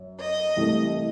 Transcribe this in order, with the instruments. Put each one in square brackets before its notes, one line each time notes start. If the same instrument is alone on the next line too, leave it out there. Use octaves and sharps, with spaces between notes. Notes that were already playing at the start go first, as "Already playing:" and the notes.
Already playing: [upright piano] F#2
[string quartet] D#5
[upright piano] C2 C3 E3 A3